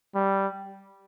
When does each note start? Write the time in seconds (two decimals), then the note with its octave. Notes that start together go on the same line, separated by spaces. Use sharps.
0.15 G3